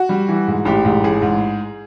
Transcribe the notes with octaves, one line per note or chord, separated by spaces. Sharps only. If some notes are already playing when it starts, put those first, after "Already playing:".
Already playing: F#4
G3
E3
G#2
A1 G4
G#2
A1 G#4
G#2